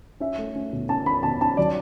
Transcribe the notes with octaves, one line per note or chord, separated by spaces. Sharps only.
C#4 E5
A3
C#4
B2
C#4 A5
C#4 B5
B2 A5
C#4 A5
F#3 D5